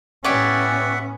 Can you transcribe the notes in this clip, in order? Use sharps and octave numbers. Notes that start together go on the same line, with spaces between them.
A2 B3 C#4 G4 C#5 D5 E5 F#5